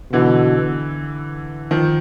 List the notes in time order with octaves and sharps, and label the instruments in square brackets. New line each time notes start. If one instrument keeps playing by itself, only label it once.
[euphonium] B2 [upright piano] D3 E3
[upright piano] D#3 F3